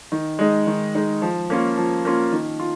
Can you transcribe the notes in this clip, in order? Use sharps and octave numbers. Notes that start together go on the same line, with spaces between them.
D#3
G#3 D#4
D#3
G#3 D#4
F3
A#3 C#4 F4
F3
A#3 C#4 F4
D#3
F4